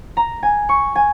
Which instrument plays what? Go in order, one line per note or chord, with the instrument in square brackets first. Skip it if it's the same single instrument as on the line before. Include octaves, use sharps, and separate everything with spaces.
[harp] A#5
G#5
C#6
G#5